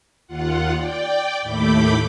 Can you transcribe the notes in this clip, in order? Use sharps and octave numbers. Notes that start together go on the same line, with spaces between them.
D#2 F4 F#5
D5 G5
D#2 A2 A3 B5 D6 G6